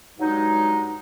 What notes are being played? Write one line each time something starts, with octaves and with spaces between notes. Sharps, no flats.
G2 F#3 G#3 D#4